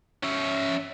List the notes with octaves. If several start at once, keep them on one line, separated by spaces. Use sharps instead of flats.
C#4 E5